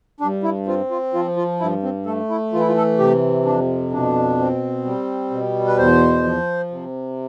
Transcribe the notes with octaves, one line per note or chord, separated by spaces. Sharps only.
G2 D4
E4
C4 F4
F4
F3 F4
F4
G2 E4
C4
A3 A4
E4
E3 F4
E4
F4
A4
C3 G4
F2 D4
B2 D4
C4
G3
B2
B4
E2 C5
F3
C3